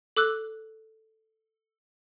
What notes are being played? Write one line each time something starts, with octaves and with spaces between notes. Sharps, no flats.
A4 D6 E6 F#6